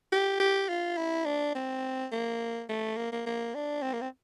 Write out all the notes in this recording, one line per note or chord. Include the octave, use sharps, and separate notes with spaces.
G4
G4
F4
E4
D4
C4
A#3
A3
A#3
A#3
A#3
D4
C4
A#3
C4